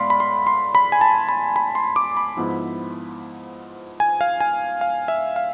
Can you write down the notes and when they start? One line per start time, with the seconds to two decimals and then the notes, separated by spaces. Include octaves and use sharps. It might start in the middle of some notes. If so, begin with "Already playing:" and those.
Already playing: A2 G#3 B3 D5 F5 B5 C6
0.10 B5
0.20 C6
0.47 C6
0.75 B5
0.92 G#5
1.01 A5
1.29 B5
1.56 B5
1.75 C6
1.96 D6
2.17 B5
2.37 G#2 F3 B3 E4
4.00 G#5
4.21 F5
4.40 G#5
4.81 F5
5.08 E5
5.36 F5